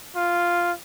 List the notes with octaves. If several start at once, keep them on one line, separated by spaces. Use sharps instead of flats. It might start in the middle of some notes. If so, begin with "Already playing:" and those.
F4